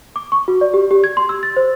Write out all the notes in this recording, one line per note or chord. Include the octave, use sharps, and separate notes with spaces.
D6
C#6
F#4
D5
G4
G4
G#6
C6
E6
A6
C5